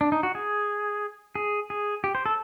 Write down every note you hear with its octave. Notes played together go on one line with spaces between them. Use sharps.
D4
D#4
F#4
G#4
G#4
G#4
G4
C5
A4